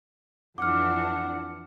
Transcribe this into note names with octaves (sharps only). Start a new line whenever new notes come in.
F2 E3 D4 F#5 D6 F6